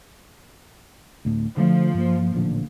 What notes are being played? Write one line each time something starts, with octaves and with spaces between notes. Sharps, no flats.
D2 A2
D3 F3 A3
G2 A#3
A1 A#2 D3